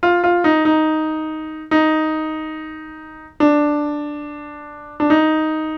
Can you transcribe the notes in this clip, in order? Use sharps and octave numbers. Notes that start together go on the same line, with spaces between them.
F4
F4
D#4
D#4
D#4
D4
D4
D#4